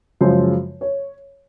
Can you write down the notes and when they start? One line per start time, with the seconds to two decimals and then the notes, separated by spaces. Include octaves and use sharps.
0.21 F#2 C#3 F3 G#3 C5
0.81 C#5